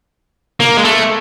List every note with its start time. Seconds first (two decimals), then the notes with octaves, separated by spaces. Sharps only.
0.60 A#3
0.77 G#3
0.85 A3